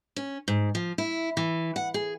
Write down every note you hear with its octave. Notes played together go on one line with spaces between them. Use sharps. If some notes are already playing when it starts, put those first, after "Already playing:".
C#4
G#2
F3
E4
E3
F#5
G#4